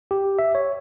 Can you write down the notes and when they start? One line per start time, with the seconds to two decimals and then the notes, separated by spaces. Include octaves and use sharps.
0.11 G4
0.39 E5
0.55 C#5